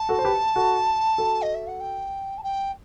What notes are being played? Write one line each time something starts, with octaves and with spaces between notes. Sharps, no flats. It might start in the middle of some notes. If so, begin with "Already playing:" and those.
Already playing: A5
F#4 A4
C5
G4 B4
F#4 A4
F#4 A4
D#5
E5
F#5
G5
A5
G5